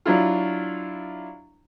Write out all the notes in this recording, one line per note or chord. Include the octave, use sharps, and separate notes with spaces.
F#3 D4 E4 F4